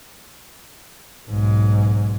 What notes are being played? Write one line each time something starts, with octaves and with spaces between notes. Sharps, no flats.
B1 G#2